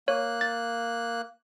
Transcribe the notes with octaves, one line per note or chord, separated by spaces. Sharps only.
A#3 C#5 F#6
A6